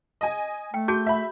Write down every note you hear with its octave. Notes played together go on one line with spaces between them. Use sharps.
D#5 G#5
A3 G5
F#4 G#4 A5 G6
E5 B5